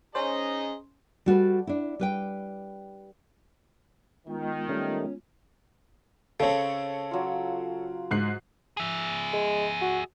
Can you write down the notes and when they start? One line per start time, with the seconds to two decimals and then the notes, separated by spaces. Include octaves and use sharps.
0.15 C#4 G#4 C5 D#5 A#5
1.26 G3 F#4 A4 B4
1.67 D4 E4
2.00 G3 B4 G5
4.27 D#3 G#3 B3 F4
4.69 G3 A3 C#4
6.40 C#3 C4 A4 C#5
7.11 F#3 F4
8.11 G#2 F#6 C7
8.77 G#4 E5
9.33 G#3
9.81 F#4